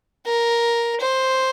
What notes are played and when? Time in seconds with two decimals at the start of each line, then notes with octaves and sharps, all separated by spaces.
0.26 A#4
1.01 C5